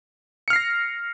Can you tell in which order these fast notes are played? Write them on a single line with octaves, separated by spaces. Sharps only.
C#7 F6 C7 A#6